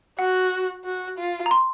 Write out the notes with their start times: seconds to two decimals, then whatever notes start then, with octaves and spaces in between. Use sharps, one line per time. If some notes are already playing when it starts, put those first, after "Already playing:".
0.19 F#4 F#5
0.85 F#4
1.18 F4
1.46 A#5
1.51 C6